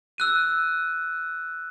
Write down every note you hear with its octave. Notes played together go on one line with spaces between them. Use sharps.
E6 F#6 D#7